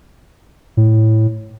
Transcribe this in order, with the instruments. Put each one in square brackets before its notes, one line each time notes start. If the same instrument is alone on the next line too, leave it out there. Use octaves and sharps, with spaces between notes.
[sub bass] A2